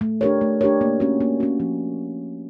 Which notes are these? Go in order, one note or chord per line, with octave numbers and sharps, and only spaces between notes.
A3
D4 G4 A#4 C#5
A3
D4 G4 A#4 C#5
A#3
C#4 F#4
A#3
C#4 F#4
F3